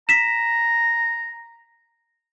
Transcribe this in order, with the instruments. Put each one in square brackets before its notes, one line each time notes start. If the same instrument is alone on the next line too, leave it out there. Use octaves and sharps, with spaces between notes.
[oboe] A#5 [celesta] B6 E7